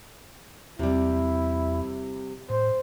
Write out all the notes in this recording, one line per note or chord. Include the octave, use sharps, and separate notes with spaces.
E2 C3 G3 E4
A2 C5